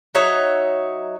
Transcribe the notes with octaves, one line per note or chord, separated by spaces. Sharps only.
F#3 D#4 C#5 E5